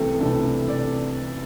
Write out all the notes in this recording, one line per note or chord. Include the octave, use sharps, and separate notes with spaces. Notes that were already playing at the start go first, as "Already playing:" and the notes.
Already playing: C2 C3 E3 A3 A4 G5
C3 E3 A3 D4 A4
C2 D5